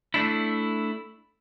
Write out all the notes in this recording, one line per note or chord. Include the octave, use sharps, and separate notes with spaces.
A3 D4 E4